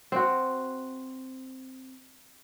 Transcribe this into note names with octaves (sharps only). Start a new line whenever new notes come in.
C4 F#4